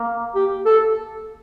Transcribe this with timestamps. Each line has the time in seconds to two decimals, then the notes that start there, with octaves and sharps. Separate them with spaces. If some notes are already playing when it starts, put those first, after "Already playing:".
Already playing: A#3
0.35 G4
0.66 A4